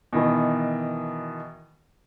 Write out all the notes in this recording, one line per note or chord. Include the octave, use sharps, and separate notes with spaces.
B2 D#3 E3